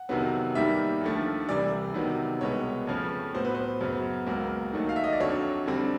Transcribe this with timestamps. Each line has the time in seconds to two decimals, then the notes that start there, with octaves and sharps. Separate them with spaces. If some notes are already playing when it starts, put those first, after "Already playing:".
Already playing: F#5
0.09 F2 C3 D#3 F#3 B3
0.55 D#2 D#3 G3 A#3 E5
1.01 D#2 D3 F3 A3
1.48 C2 C3 E3 G3 D5
1.94 C3 D#3 F#3 B3
2.41 C2 B2 G#3 B3 C#5
2.87 F2 C#3 F3 A3 C#4
3.35 A2 F#3 B3 C5
3.45 B4
3.55 C5
3.81 F#2 C#3 F#3 B3
4.27 C#2 C#3 F#3 A#3
4.73 D#2 D#3 F#3 A3
4.89 F5
4.96 E5
5.04 D#5
5.13 D5
5.20 F2 D3 F#3 C#5
5.66 F2 D3 G3 C4